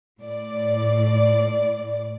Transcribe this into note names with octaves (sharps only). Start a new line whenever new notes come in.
A2 D5